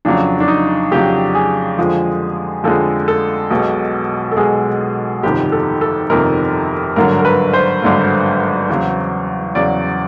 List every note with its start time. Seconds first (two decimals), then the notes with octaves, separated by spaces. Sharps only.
0.05 F2 C#3 F#3 D4
0.40 D4
0.48 D#4
0.92 F2 C#3 F#3 G4
1.34 G#4
1.78 F2 D3 F3 G#3
2.64 F2 D3 F3 G#3 A4
3.08 A4
3.51 B1 B2 G#3
4.31 A4
4.37 B1 B2 G#3 G#4
5.23 G1 F2 C3 D#3 G4
5.52 A4
5.81 A4
6.09 G1 F2 C3 D#3 A#4
6.96 G#1 G2 D3 F#3 A#4
7.19 A#4
7.25 B4
7.53 C5
7.82 G#1 G2 D3 F#3
8.69 E2 C#3 F#3
9.55 E2 C#3 F#3 D5